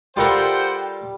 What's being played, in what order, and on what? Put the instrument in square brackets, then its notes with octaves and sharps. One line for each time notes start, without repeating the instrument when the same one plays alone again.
[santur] G3 [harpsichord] F4 A4 A#4 [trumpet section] C5 F#5 G5